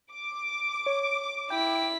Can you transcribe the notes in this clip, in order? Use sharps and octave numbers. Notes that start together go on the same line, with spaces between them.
D6
C#5
E4 G5 B6